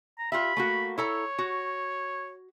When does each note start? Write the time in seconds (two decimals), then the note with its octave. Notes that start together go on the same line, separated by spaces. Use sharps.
0.18 A#5
0.32 F4 G4 E5 B5
0.57 A3 A#3 F#4
0.98 E4 A4 C#5 A#5
1.38 F#4